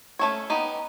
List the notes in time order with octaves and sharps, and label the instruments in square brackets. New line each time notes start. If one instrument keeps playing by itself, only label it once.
[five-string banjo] A3 C#4 E4 A4 C#5
B3 D#4 G4